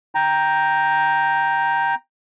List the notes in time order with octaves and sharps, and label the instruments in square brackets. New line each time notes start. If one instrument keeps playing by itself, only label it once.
[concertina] G5 A#5